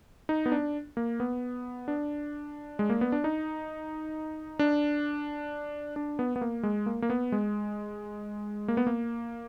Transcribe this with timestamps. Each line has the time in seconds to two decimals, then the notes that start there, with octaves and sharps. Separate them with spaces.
0.29 D#4
0.46 B3
0.52 D4
0.97 A#3
1.20 B3
1.88 D4
2.79 G#3
2.90 A#3
3.01 B3
3.12 D4
3.24 D#4
4.59 D4
5.96 D4
6.19 B3
6.36 B3
6.41 A#3
6.63 G#3
6.86 A#3
7.02 A#3
7.10 B3
7.32 G#3
8.68 A#3
8.77 B3
8.87 A#3